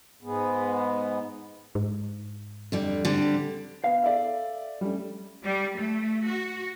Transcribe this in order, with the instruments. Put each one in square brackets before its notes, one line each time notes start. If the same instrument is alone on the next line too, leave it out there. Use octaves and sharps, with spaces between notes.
[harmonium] G#2 G#3 B3
[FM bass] G#2
[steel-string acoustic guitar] F2 D3 G3
D3 G3 C4
[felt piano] B3 [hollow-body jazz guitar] F5
[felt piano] A4 D5 E5
G3 A3 C#4
[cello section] G3
A3
F#4